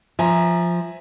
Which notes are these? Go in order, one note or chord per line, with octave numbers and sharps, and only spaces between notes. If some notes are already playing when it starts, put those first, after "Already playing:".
F3 E5 G#5 A#5